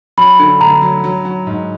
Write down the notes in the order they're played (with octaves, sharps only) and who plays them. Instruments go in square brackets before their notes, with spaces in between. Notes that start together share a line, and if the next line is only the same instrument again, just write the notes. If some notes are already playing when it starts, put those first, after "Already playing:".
[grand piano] F#3 [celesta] B5
[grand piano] D3
[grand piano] D2 [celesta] A#5
[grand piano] F#3
F#3
F#3
G#2